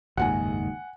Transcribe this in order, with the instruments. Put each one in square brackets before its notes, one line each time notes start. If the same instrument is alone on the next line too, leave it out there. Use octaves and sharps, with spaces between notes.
[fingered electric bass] F#1 D#2 G#2 [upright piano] F#5 G#5